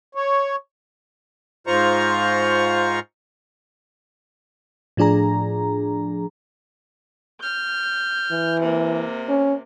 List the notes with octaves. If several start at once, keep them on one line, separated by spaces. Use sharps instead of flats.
C#5
G#2 F4 C5 A#5 C#6
A2 F3 D4 G#4 A#5
F6 G6
E3
C3 A#3
C#4